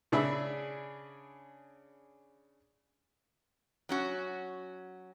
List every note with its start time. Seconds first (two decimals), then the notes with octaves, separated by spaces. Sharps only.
0.12 C#3 D4 G#4 E5 B5
3.89 F#3 C#4 F#4